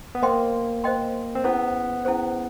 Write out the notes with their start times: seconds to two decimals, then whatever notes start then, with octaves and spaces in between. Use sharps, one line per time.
0.15 B3
0.22 A#3 C5 D#5 G5 C6
0.84 C5 D#5 G5 C6
1.35 C4
1.44 B3 C#4 E4 G#4 C5
2.05 C#4 E4 G#4 C5